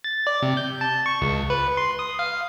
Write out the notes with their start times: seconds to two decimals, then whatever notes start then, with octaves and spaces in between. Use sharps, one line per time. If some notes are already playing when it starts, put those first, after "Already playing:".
0.04 A6
0.27 D5
0.42 C3
0.57 G6
0.81 A5
1.06 C#6
1.22 C#2
1.50 B4
1.77 C6
1.99 D#6
2.19 F5